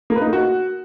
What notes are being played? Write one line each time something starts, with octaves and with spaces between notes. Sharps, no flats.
A#3
B4
D#4
A#3
F#4